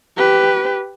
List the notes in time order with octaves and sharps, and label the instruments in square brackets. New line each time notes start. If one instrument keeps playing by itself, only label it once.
[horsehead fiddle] G4 B4